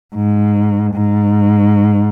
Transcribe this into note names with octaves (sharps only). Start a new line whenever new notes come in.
G#2
G#2